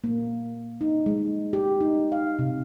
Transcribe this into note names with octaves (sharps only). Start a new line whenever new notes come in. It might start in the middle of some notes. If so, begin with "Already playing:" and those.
A#3
D#4
G#3
G4
D#4
F5
C3